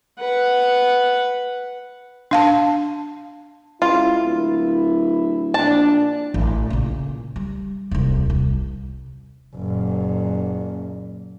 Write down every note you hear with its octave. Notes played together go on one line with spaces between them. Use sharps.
B4 F#5
D4 F5 A5
C#2 E4 F4
D1
A#2 F3 D4 A5
A1
A#2 C#3
G3
D#1 C2
C2
F#1 A#2